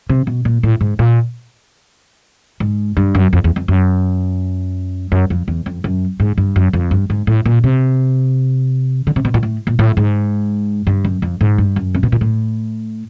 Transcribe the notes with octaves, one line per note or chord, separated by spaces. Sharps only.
C3
B2
A#2
A2
G#2
A#2
G#2
G2
F#2
F2
E2
F2
F#2
F#2
F2
E2
F2
F#2
G#2
G2
F#2
F2
G2
G#2
A2
A#2
C3
D3
C3
B2
A#2
A2
A#2
A2
G#2
G2
F#2
F2
G#2
G2
F#2
C3
B2
A#2
A2